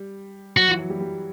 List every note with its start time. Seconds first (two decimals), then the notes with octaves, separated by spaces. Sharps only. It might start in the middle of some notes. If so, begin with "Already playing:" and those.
Already playing: G3
0.57 F#3 F#4
0.68 E3
0.79 F#3
0.90 G3
1.00 G3